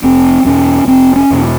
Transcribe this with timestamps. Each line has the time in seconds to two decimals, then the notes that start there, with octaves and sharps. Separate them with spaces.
0.03 F1 C4
0.46 E2 B2 C#4
0.88 F1 C4
1.16 C#4
1.30 E2 B2